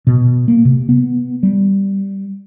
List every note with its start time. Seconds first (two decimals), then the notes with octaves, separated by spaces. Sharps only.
0.07 B2
0.48 A#3
0.65 C3
0.89 B3
1.43 G3